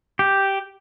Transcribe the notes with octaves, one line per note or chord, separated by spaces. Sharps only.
G4